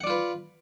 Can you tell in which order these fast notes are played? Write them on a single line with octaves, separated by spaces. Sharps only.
F#5 D5 F4 B4